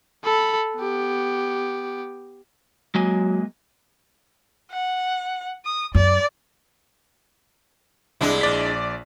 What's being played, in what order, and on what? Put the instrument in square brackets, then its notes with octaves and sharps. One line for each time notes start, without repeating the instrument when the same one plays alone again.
[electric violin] A4 B5
B3 G4
[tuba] F#3 [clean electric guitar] G#3 A#3 G#5
[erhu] F#5
D#6
[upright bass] F#2 [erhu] D5
[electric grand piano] C2 [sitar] G#3 D4 E4
[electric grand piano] A#1 D5 B6